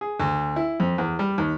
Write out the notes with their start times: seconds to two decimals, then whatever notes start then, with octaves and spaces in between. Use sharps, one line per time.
0.01 G#4
0.20 D2
0.56 E4
0.80 F2
0.98 E2
1.19 G3
1.38 D#2